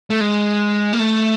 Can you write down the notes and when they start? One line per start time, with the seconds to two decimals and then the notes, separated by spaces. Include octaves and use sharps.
0.10 A3
0.21 G#3
0.93 A#3
1.00 A3